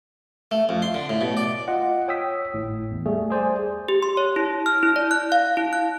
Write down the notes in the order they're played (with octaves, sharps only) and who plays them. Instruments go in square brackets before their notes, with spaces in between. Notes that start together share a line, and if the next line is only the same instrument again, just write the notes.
[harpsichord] A3
F2
C6
D3
A2
B2
D5
[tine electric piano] F4 D#5 F#5
C#5 G5 D#6 E6 B6
G#1 A2
E2
G3 A3 G#4
G#4 C5 D5 G#5
[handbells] G4
C6
C#5
E4
F6
E4
D5
F#6
F5
E4
F#6